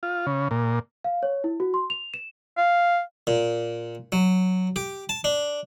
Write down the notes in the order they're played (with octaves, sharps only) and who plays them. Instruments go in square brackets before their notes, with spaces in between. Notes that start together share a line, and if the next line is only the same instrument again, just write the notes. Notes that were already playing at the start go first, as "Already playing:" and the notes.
[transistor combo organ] F4
C#3
A#2
[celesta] F5
C#5
E4
F#4
C6
F7
E7
[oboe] F5
[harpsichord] A#2
F#3
G4
A5
D4